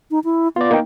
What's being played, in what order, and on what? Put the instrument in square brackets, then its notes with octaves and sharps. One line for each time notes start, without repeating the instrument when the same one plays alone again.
[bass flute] D#4
E4
[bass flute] B3 [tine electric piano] F4 D5
[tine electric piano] A#3 D#4 G5